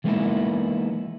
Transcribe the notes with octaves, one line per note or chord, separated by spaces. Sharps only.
E3 G#3 A#3 B3 D#4 E4